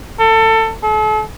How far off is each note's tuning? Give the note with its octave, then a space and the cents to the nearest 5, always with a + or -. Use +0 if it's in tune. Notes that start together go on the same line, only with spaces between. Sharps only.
A4 +25
A4 -40